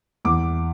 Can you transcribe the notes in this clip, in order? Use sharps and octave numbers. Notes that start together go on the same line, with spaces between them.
E2 D6